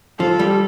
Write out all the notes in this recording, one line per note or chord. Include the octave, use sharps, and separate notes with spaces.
F3 A4
G3